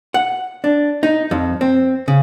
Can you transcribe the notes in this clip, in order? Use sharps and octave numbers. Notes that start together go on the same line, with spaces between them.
F#5
D4
D#4
F2
C4
C#3